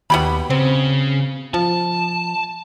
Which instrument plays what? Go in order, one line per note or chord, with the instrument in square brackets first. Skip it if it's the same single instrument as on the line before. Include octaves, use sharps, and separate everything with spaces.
[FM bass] D#2 [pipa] B2 G4 B5
[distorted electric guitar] C#3 [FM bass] C4
[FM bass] F3 [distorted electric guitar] A5